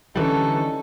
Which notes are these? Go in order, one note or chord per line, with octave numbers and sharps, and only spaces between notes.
D3 E3 G3 C#4 D#4 A4